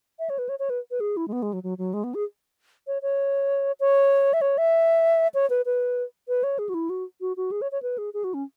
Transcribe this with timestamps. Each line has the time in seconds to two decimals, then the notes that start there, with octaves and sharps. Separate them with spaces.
0.19 E5
0.30 C#5
0.39 B4
0.49 C#5
0.59 C#5
0.70 B4
0.91 B4
1.00 G#4
1.17 E4
1.28 G#3
1.33 B3
1.42 G#3
1.53 F#3
1.63 F#3
1.78 F#3
1.94 G#3
2.04 B3
2.14 G#4
2.87 C#5
3.02 C#5
3.80 C#5
4.33 E5
4.41 C#5
4.58 E5
5.34 C#5
5.50 B4
5.66 B4
6.28 B4
6.43 C#5
6.59 G#4
6.69 F#4
6.74 E4
6.90 F#4
7.21 F#4
7.37 F#4
7.51 G#4
7.62 C#5
7.72 C#5
7.83 B4
7.98 G#4
8.14 G#4
8.24 F#4
8.34 C#4